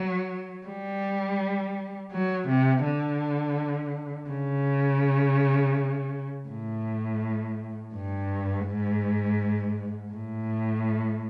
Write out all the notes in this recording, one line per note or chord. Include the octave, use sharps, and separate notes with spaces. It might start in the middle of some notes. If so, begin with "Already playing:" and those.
Already playing: F#3
G3
F#3
C3
D3
C#3
A2
G2
G#2
A2